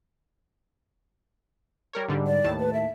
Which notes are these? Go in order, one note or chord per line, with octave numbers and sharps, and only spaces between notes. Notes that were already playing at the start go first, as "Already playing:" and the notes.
G3 A#4 C#5
G#2 D3 G3
D5
D#2 A2 A5
B4
E5